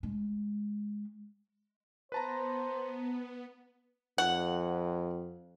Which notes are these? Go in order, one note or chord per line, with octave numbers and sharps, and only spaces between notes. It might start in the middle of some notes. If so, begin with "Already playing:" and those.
G#3
B3 B4 C5 A5 A#5
F2 F#5